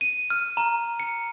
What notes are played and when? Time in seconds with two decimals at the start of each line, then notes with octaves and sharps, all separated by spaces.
0.01 D#7
0.30 F6
0.57 A#5
1.00 C#7